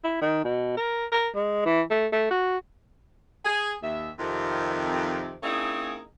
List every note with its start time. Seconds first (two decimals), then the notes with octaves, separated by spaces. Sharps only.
0.04 E4
0.21 D#3
0.44 B2
0.77 A#4
1.12 A#4
1.36 G#3
1.65 E3
1.90 A3
2.12 A3
2.31 F#4
3.45 G#4
3.83 D#2 E5
4.19 F2 C3 D#3
5.43 A#3 C4 C#4 D#4 E4 G#4